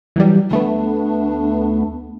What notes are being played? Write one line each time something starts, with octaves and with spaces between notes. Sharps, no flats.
E3 F#3 G3
D2 A3 B3 D4